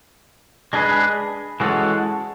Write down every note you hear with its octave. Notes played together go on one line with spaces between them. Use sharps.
G#3 D4 G#4 B4
E3 G#3 C#4 F#4 A4